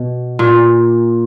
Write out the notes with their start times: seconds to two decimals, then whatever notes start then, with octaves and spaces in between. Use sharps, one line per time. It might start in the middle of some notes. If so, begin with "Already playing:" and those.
Already playing: B2
0.39 A#2